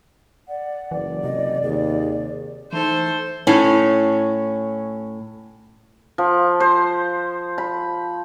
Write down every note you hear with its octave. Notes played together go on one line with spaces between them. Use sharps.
D5 F#5
F#1 E3 D5
C3 D#5
D#2 G#4
E3 A3 D#4 A4 C5
A2 C#4
F3
C5
B5